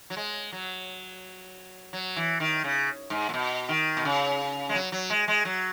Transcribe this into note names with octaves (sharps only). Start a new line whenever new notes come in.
F#3
G#3
F#3
F#3
E3
D#3
C#3
G#2
A#2
B2
D#3
B2
C#3
G#3
F#3
F#3
G#3
G#3
F#3